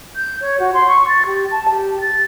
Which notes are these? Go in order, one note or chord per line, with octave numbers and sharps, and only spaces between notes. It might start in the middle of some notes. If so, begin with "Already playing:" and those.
G6
C#5
F#4
C6
C#6
A6
G4
A5
G4
A6